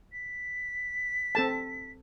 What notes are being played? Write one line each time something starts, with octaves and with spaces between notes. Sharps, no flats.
B6
C4 A4 A5